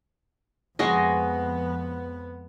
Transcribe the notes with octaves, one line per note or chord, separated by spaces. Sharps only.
F2 G#3 B3 F#4 D#5